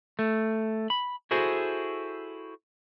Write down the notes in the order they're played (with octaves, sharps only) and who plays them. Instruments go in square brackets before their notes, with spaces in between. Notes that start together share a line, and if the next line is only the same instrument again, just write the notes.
[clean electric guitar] A3
B5
E4 F#4 G#4 A4 C5